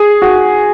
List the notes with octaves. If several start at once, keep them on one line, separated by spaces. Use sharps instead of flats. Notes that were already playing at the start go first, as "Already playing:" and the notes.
Already playing: G#4
F#4